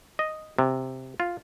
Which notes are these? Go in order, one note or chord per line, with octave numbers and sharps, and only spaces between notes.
D#5
C3
F4